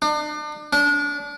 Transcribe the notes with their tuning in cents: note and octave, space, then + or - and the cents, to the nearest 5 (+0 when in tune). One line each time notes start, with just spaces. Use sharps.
D4 +40
D4 -25